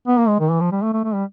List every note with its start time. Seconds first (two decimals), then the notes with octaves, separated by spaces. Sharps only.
0.08 B3
0.18 A#3
0.28 G#3
0.40 D#3
0.51 E3
0.61 F3
0.72 G3
0.83 A3
0.94 A3
1.04 A3
1.15 G3